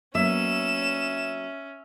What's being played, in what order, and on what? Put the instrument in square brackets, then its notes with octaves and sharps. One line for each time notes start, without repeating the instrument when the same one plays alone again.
[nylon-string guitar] F#3 A#3 B3 [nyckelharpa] C#4 [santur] E5 [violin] E7